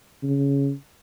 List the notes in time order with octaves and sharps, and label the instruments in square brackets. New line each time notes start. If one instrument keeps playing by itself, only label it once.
[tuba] C#3